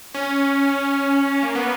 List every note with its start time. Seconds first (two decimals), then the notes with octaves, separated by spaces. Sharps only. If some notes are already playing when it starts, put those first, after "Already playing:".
0.15 C#4
1.43 A#3
1.55 B3